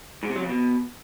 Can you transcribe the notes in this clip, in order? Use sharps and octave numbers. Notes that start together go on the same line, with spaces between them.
G#2
C3
F#3
F2
B2